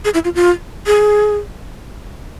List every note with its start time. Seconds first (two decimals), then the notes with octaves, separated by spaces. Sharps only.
0.05 G#4
0.14 E4
0.25 F4
0.35 F4
0.87 G#4